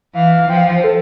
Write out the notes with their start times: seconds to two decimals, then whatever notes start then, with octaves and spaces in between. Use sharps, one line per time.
0.14 E3 F5
0.49 F3 G5
0.58 F5
0.75 C5
0.84 A4